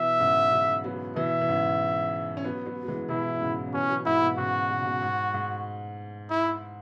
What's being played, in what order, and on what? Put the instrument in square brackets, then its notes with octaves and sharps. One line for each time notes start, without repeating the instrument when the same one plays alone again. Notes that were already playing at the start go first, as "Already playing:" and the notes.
Already playing: [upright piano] B2 E3 [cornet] E5
[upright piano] G#2 C#3
C#3 F#3
F#3 B3
[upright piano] B2 E3 [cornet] E5
[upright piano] E3
G#2 C#3
C#4
F#3 B3
F#3 B3
F#3
E3 G#3
[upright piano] B2 E3 [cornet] E4
[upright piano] G#2 C#3
C#3
[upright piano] B2 E3 [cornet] C#4
[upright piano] F#3 B3
[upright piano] G#2 [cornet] E4
[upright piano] B2
[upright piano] G#2 C#3 [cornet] F#4
[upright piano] B2
C#3
B2
G#2
G#2
[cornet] E4